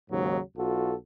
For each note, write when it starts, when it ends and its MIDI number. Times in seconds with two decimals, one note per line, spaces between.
0.11 0.40 39
0.11 0.40 44
0.11 0.40 49
0.11 0.40 54
0.57 0.94 35
0.57 0.94 65
0.57 0.94 66
0.57 0.94 69